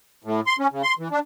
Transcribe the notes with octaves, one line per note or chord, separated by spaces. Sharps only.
A2
C6
C#4
C#3
C6
E3
D4